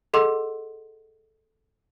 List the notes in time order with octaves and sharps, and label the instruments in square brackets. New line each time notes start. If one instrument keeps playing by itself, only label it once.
[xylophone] G#4 A4 D#5 F#5 C6 E6